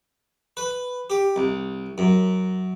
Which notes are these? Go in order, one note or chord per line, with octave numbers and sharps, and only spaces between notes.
B4
G4
C2
F#2